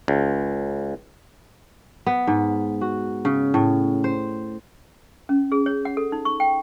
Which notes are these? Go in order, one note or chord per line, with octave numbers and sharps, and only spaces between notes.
C#2
B3
G#2
F#4
C#3
A2
C5
C#4
G#4
C#5
F#5
A4
D#4
C#6
G5